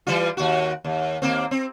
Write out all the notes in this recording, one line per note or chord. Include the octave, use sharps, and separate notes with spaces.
E3 G3 F4
D#2 F#4
D#2
D#2 A#3 C4
C4